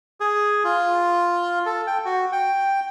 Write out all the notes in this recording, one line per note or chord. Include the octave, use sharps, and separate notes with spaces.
G#4
F4
A4
G5
F#4
G5